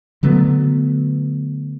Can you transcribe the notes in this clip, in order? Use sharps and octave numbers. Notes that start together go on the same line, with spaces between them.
D3 F#3 A3 B3